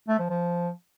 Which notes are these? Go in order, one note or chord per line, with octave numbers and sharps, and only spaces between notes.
A3
F3
F3